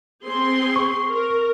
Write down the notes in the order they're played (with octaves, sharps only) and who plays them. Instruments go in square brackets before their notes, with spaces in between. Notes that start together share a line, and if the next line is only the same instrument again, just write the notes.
[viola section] C4 G#4 C6
[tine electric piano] C#6
[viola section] A#4